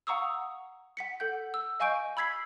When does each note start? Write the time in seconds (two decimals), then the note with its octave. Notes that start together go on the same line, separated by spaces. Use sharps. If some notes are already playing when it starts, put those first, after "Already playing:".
0.07 F5 F#5 A#5 C#6 D#6 E6
0.97 F#5 B6 C#7
1.20 A4 F#5 G6
1.54 E6
1.80 D#5 F5 G#5 C#6 G6 D7
2.17 B5 E6 G#6 B6 C7